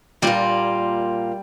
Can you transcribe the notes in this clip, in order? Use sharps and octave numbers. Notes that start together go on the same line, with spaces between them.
A#2 G3 A#3 F4